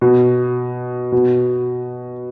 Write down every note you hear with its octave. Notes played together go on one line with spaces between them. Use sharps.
B2
B2